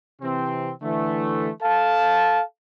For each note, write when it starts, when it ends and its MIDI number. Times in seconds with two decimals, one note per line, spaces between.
0.22 0.71 48
0.22 0.71 52
0.22 0.71 60
0.82 1.49 50
0.82 1.49 52
0.82 1.49 57
1.62 2.41 69
1.62 2.41 77
1.62 2.41 81